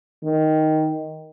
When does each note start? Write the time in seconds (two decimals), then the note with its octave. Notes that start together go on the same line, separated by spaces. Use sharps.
0.24 D#3